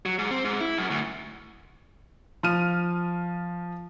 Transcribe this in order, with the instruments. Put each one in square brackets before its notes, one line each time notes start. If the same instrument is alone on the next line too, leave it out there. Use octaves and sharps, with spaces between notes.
[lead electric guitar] F#3
G#2
C4
G#2
E4
F#2
D2
[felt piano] F3 F6 D#7